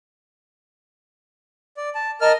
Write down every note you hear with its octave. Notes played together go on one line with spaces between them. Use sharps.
D5
A5
A#4 D#5 A5 F6